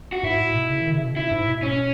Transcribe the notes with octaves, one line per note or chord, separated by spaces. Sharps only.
F#4
G#2 E4
A2
B2
C#3
D#3
C#3
B2
E4
G#2
B2
C#4